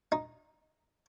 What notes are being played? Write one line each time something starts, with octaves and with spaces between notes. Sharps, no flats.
D#4